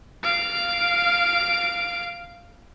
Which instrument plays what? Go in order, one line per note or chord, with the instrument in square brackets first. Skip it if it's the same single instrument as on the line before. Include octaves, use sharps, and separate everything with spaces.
[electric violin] F5 D7